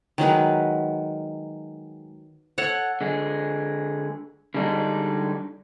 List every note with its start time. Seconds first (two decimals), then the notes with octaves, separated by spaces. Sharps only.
0.18 D#3 F#3 G#3 B4
2.58 A4 C#5 F#5
3.01 D3 G#3
4.54 D3 G3 G#3 D4 D#4